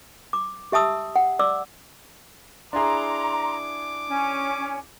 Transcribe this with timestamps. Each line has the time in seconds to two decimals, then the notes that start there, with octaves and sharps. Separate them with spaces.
0.33 D6
0.72 G4 E5 A5 D#6 E6
1.16 F#5
1.39 D5 D6 E6
2.73 D4 E4 G#4 A#5 C6 D6
4.08 C#4 G#5